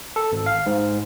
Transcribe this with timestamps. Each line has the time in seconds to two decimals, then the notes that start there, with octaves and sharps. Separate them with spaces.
0.16 A4
0.32 G#1
0.46 F5
0.66 G#2